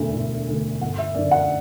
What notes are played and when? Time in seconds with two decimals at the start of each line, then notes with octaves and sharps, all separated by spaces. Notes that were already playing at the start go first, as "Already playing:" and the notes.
Already playing: E1 D2 D3 A3
0.14 E1
0.48 D2 D3 A3
0.81 G1 F#5
0.98 E5
1.15 F#2 D3 D5
1.31 F#5